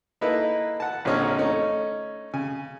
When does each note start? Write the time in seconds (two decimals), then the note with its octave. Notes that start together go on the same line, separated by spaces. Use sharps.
0.21 A#3 D#4 E4 A4 B4
0.80 F#5 A5
1.05 A#1 D3 C4 C#4 D#5 F6
1.38 A3 C#4 D#4
2.34 C#3 G#5